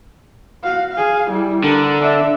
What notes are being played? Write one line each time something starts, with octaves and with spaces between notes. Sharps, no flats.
F#4 F5
G#4 F5
G3 E4
D3 A#4
D4 E5